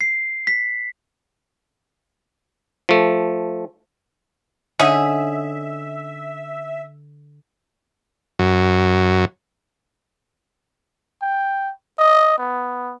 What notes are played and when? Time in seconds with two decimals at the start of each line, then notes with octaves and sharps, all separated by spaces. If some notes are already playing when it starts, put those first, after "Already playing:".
0.01 C7
0.47 B6
2.89 F3 A3
4.79 D3 C#4 D#4 G#4 E5
8.39 F#2
11.22 G5
11.99 D#5
12.38 B3